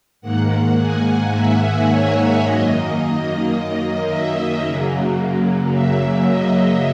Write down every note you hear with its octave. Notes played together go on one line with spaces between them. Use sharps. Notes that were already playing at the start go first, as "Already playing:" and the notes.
G#2 D#3 A#3 F#5
G#5
E5
C#5
F#2 D#3 A#3 D#5
E5
F#2 C#3 F#3 A#3
E5
D#5